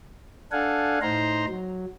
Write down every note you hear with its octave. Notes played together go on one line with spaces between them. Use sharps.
D4 A4 F5 F#5 G#5
A2 D#4 C5 A#5 C6
F#3